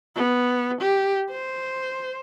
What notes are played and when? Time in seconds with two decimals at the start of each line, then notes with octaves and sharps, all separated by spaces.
0.16 B3
0.81 G4
1.30 C5